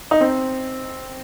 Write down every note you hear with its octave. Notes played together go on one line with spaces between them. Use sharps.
D#4
C4